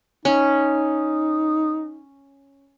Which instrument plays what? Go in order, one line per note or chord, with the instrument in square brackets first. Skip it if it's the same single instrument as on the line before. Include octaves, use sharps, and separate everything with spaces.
[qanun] C#4 [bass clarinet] D#4